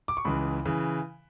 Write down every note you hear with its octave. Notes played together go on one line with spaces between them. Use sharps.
D6
C#6
C#2 C#3 E3 B5
C#3 E3